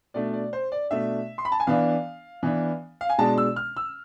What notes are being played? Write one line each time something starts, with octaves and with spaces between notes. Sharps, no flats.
B2 A3 D4 D5
D5
C5
D5
B2 A3 D4 E5
C6
B5
A5
G#5
E3 B3 D4 F5
E3 B3 D4
F5
G#5
B2 G#3 D4 A5
E6
F6
E6